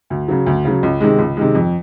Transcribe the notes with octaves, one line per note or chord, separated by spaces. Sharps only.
D2
C#3 F#3
D2
C#3 F#3
C#2
C3 D#3 G#3
C#2
C3 D#3 G#3
F2